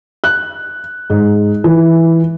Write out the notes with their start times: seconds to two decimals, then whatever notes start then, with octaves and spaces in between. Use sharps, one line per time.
0.24 F#6
1.10 G#2
1.64 E3